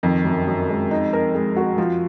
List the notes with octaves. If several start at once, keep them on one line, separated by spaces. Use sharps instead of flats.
F2 D#3
F#2
F#2
G#3
D#4
A#4
G#3
F#4
F3